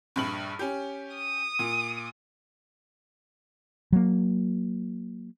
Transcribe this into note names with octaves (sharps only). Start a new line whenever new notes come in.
A#1 G2 F#7
C#4 G4
D#6
A#2
F#3 A#3